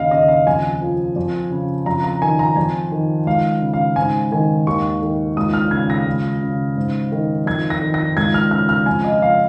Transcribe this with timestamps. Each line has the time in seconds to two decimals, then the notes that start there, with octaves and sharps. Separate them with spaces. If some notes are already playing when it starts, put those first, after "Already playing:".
Already playing: D#2 C#3 D#5 F5
0.11 C#3 D#5
0.28 F5
0.47 F2 G#5
0.82 F3
1.16 F2
1.51 C#3
1.86 F2 A#5
2.04 A#5
2.22 D#3 G#5
2.39 A#5
2.56 F2 G#5
2.92 D#3
3.26 C#2 F5
3.62 C#3
3.73 F5
3.96 G#2 G#5
4.32 D#3 G#5
4.67 D#2 C#6
5.02 D#3
5.37 C#2 D#6
5.54 F6
5.71 C#3 G#6
5.90 A#6
6.06 C#2
6.42 C#3
6.76 G#2
7.12 D#3
7.46 F2 G#6
7.70 A#6
7.82 D#3
7.94 A#6
8.17 C#2 G#6
8.34 F6
8.51 C#3 F6
8.69 F6
8.86 F2 G#5
9.04 D#5
9.21 F3 F5